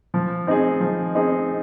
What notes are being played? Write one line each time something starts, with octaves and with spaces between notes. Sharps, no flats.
F3
C4 D#4 G#4
F3
C4 D#4 G#4